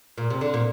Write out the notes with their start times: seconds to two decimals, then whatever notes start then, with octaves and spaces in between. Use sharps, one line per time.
0.18 A#2
0.30 C3
0.41 D3
0.54 A#2